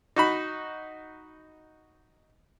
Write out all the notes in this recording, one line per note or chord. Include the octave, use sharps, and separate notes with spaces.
D#4 F#4 B5